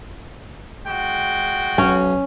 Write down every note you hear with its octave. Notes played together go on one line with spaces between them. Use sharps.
G#3 F#4 G5
B1 C#4